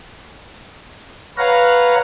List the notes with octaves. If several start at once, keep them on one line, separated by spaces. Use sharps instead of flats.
B4 C#5 F5 F#5 A#5